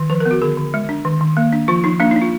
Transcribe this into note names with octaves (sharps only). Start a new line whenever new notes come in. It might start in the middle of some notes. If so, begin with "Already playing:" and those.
Already playing: D#3
F3 B4
A#4
B3
F#4
D3 G#4
D3
G#3
D4
D#3
D#3
A#3
D4
F3 F4
F3 D#4
A#3 D4
D#4
D4
F4